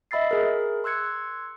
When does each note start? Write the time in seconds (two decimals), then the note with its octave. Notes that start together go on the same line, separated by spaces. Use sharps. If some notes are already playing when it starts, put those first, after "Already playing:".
0.11 D#5 E5 B5 E6 A6 C7
0.31 G#4 A#4
0.84 C6 E6 F#6 G#6 C#7